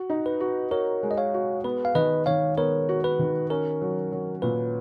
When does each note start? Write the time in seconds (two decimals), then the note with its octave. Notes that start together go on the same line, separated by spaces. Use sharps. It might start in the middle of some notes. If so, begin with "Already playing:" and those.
Already playing: F#4
0.10 D#4
0.26 B4
0.40 F#4
0.71 F#4 A#4 C#5
1.03 G#3
1.11 D#5
1.18 C#5 F5
1.34 F#4
1.64 B3 B4
1.85 F5
1.95 D#3 B4 D#5
2.26 D#3 C#5 F5
2.57 B3 A#4 C#5
2.89 F#4
3.04 B4
3.19 D#3
3.50 C#4 A#4
3.81 F#3
4.12 F#3
4.42 A#2 B4